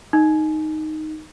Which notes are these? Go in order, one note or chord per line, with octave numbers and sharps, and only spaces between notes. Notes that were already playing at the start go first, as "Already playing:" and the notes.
D#4